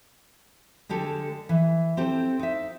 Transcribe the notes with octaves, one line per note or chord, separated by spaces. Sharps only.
D3 G#3 G4 A4
E3
C4 G4 A4
D#4 E5